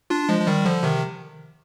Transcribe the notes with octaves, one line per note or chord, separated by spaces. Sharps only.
D4 F4
F3 G#3
F3
D#3 G3
D3 F3
C3 D#3